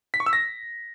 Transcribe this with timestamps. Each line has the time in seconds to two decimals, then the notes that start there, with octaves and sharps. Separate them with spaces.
0.14 B6
0.20 C#6
0.26 E6
0.33 A#6